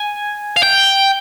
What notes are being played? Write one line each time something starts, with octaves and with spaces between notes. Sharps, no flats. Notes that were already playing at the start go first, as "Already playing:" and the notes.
Already playing: G#5
F5
G5